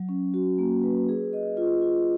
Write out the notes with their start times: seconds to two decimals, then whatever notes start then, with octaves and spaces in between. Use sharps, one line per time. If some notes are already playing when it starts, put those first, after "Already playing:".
Already playing: F#3
0.09 C#4
0.34 F#4
0.58 A#3
0.83 B4
1.09 G#4
1.33 D#5
1.57 F4
1.82 F4